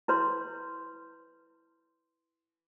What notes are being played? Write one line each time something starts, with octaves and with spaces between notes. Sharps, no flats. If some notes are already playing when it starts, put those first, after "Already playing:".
E4 B4 C#5 C6